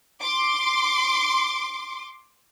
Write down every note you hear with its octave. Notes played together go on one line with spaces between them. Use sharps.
C6 D6